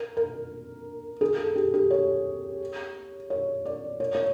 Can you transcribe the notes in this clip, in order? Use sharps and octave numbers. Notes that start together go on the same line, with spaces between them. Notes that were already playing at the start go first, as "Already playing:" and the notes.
Already playing: A#4
A#4
G#4
A4
G4
G4
C#5
C#5
D5
C#5
C#5